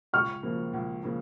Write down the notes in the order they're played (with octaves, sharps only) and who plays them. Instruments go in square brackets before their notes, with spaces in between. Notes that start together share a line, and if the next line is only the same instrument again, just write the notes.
[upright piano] C#2 [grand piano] C#6 F6
[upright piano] C#3 F3 A#3
C#2
C#3 F3 A#3